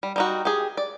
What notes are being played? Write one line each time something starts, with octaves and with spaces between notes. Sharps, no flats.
G3
G3 D#4 F#4
G4 G#4
D5